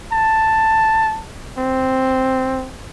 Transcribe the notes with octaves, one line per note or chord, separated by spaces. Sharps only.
A5
C4